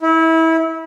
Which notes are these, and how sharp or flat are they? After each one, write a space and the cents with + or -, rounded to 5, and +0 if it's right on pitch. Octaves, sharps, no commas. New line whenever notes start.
E4 -25